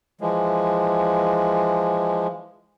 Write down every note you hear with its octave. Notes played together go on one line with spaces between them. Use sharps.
E3 F3 G#3